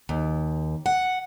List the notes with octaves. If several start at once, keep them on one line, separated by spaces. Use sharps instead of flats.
D#2
F#5